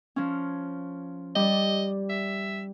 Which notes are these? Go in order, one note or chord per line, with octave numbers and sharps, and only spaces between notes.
F3 C#4
G3 D5 D#5
E5